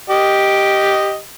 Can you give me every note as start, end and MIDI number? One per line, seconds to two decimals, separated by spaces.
0.10 1.17 67
0.10 1.17 75